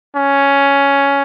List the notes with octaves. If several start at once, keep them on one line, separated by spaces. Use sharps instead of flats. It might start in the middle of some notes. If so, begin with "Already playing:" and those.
C#4